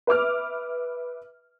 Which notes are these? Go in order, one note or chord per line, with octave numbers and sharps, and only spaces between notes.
B4 E5 D6 F6